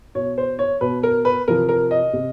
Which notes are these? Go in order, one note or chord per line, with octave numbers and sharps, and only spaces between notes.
B2 C#5
C5
C#5
B2 B4
A#4
B4
C3 F3 A#4
A#4
D#5
C3